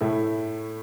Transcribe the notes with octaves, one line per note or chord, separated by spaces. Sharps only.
A2 A3 E4